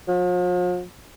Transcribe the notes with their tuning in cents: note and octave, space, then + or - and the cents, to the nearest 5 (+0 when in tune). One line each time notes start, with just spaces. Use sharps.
F3 +45